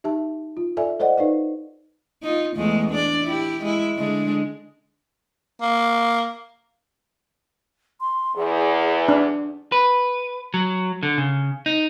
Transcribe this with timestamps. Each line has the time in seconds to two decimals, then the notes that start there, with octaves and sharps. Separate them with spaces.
0.04 D#4 G4 E5 A5
0.57 F4
0.77 A4 D5 E5 G#5
1.00 A4 C5 D5 D#5 F#5
1.17 D#4 B4 D5 F5
2.22 D#4 F4
2.56 E2 G#3 A3
2.90 D4 D5
3.25 E4 G4
3.63 G#3 E4
3.96 D3 G#3 D4
5.62 A#3
8.01 C6
8.36 E2 G#4
9.09 D4
9.72 B4
10.54 F#3
11.03 D3
11.18 C#3
11.66 D#4